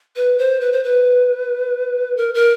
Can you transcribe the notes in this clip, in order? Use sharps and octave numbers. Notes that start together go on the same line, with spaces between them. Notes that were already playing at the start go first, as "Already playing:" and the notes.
B4
C5
B4
C5
B4
A#4
A#4